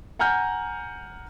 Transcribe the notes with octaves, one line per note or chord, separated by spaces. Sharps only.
F#5 G#5 A#5 F6 G6